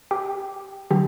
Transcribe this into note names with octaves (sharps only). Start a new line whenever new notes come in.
G4 G5
D3 F#3 G4 G5